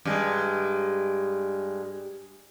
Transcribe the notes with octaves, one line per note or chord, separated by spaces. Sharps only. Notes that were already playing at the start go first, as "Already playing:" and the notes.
G2 G#3